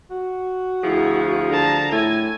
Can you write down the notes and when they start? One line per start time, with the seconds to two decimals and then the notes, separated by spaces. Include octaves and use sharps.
0.10 F#4
0.84 D2 F3 E4 F4 G#4
1.50 D3 A5 A#5
1.92 A2 E5 G#5